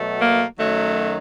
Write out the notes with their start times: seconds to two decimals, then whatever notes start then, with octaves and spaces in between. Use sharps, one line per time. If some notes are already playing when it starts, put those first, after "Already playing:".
Already playing: B2 F#3 A3
0.20 A#3
0.58 F#2 D#3 F#3 A3